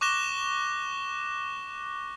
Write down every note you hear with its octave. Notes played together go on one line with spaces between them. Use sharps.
C#6 D6 F#6 A#6 E7 G7